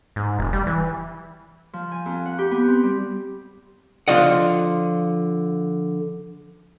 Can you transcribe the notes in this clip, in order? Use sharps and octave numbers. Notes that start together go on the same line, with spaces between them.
G#2
F1
G3
E3
F3
G#5
F2
F#5
G4
B3
C4
G3
D3 F3 F4 D#5 F#5